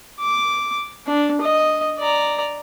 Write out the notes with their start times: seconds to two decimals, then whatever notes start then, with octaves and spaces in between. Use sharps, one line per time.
0.20 D6
1.07 D4
1.42 D#5
1.99 D5 A#5